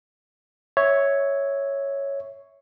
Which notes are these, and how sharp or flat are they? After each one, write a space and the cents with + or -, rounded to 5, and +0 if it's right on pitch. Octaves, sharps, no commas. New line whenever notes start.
C#5 +0 E5 -10